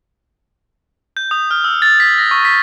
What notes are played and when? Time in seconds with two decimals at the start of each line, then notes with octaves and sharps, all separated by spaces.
1.17 G6
1.31 D#6
1.51 F6
1.64 E6
1.82 A6
2.00 B6
2.18 A#6
2.31 C#6
2.45 B6